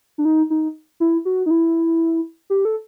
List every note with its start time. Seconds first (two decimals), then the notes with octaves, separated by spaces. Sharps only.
0.18 D4
0.25 D#4
0.50 D#4
1.00 E4
1.25 F#4
1.46 D#4
1.51 E4
2.50 G4
2.65 A4